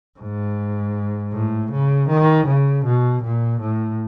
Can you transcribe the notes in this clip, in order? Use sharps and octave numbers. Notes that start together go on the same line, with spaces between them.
G#2
A2
C#3
D#3
C#3
B2
A#2
A2